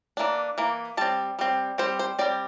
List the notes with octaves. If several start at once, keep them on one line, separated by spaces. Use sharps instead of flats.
E3 A#3 D4
E3 A#3
G3 C4 A5
G3 C4
G3 C4 C5
C5
G3 C4 D5